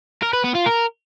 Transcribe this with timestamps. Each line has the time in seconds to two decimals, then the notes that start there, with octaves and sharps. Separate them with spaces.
0.22 A#4
0.33 B4
0.44 B3
0.55 F4
0.66 A#4